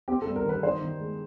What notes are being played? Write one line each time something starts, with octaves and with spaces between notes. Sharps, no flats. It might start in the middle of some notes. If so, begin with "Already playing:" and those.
C4 G4
A4
G2
A#4
D#3 B4
D#4 C5
D#3
G#3